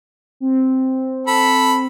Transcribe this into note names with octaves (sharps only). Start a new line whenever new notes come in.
C4
A4 B5